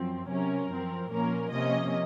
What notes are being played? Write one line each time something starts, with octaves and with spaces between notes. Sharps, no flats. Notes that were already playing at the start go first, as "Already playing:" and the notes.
Already playing: F#2 F3 C4
C3 F#3 C#4 A#4
F#2 F3 C4
A#2 F3 A#3 C#4 A#4
C3 F3 A#3 C#4 D#5